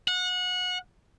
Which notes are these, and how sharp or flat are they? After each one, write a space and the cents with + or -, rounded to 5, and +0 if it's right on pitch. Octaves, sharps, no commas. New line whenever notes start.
F#5 -25